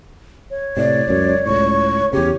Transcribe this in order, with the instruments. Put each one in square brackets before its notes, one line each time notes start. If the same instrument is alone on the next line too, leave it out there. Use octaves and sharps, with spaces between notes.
[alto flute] C#5
[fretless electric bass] A2 C3 [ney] D5
[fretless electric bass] C#2 F#2
[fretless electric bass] C#2 A2 [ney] C#6
[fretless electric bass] E2 C#3 [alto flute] G4 [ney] C#5